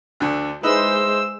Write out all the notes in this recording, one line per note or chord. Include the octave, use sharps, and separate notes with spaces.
D2 D3
G#3 D#4 E4 B4 C5 E6